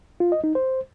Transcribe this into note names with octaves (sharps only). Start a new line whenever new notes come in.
F4
D#5
D#4
C5